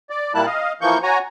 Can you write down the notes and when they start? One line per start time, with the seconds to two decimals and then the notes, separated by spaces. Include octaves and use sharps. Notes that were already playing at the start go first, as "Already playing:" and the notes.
0.10 D5
0.35 A#2 G3 A#3 E4 A5 F#6
0.46 D#5 F5
0.81 E3 F3 A#3 C#6 G6
1.03 F#4 C#5 G#5 A#5